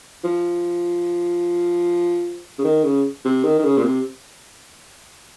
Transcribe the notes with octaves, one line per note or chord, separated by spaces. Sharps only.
F3
C#3
D#3
C#3
C3
D#3
D#3
C#3
A#2
C3